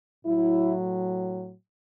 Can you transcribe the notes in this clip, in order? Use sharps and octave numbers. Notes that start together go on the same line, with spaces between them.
A2 F#3 E4